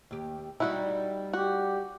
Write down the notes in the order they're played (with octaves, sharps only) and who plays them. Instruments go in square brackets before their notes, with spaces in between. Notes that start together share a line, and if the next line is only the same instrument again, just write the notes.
[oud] D#2 G4
[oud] G3 D#4 [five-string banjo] E4 F#4
[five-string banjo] F#4 [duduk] G4